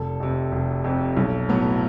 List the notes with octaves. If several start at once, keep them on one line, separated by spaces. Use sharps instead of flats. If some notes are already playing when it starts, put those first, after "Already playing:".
Already playing: F1 A4
F2 C3
F1
F2 C3
B1
A2 F#3 B3